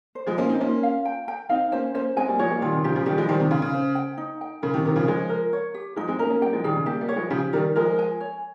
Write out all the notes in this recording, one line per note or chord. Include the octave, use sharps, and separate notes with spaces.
C5
F3 G#3
A#3 C#4 C5
C4 D#4
A#3 C#4 F4
F5
G5
G5
C4 D#4 F5
A#3 C#4 C5
A#3 C#4 C5
G#3 C4 G#5
G3 A#3
F3 G#3 C#5
G3 A#3
D#3 G3 F4
C3 D#3
C#3 F3 G4
C#3 F3
D#3 G3 G4
F3 G#3
D#3 G3 C5
C3 D#3
C#3 F5
C#3
C5
G5
D#4
G5
C#3 A#4
C3 D#3
C3 D#3 A#4
C#3 F3
F3 G#3 C#5
A#4
C#5
G4
F3 G#3 D#4
G#3 C4
A#3 C#4 A#4
A#3 C#4
G3 A#3 G5
F3 G#3
D#3 G3 G#4
C#3
G3 A#3 G4
G3 A#3
C#5
F3 G#3
C#3 F3 G4
D#3 G3 A#4
F3 G#3 A#4
G#5
C#5